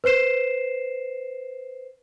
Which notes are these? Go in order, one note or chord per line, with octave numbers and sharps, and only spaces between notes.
B4 C5 C7 E7